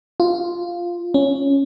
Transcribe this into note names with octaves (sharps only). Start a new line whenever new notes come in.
F4
C#4